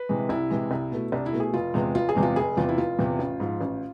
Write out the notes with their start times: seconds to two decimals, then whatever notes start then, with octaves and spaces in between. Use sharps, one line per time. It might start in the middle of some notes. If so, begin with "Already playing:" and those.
Already playing: B4
0.09 C3 E3 G#3
0.29 C2 E4
0.50 C3 E3 G#3
0.71 C2
0.92 B2 A3
1.12 C2 D4
1.26 E4
1.33 B2 A3
1.40 G#4
1.54 F1 F4
1.74 E2 C3 G#3
1.95 F1 F4
2.09 G#4
2.15 E2 C3 G#3
2.23 F4
2.36 F1 G#4
2.57 E2 C3 F4
2.69 E4
2.78 F1 F4
2.99 E2 C3
3.19 A1
3.40 G#2 F3
3.61 A1